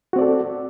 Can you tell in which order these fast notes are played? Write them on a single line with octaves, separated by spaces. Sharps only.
F#4 C4 D5 A4